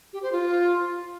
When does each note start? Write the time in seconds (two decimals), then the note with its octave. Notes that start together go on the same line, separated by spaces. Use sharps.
0.13 G4
0.23 C5
0.32 F4